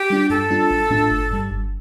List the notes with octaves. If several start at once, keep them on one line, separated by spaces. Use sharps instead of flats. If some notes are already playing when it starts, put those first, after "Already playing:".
Already playing: G4
G3 D4 F4
G2 A4
G3 D4 F4
A1
A2 A3 D4 F4
G1
G2 G3
G1